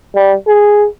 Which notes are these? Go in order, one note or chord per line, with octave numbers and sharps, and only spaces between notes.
G3
G#4